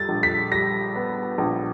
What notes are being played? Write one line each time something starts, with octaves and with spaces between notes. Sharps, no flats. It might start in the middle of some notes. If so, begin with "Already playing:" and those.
Already playing: G3 A6
A#1
B6
G3 A#6
B3
A#1